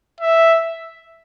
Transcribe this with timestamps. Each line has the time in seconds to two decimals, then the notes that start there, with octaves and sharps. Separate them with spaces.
0.21 E5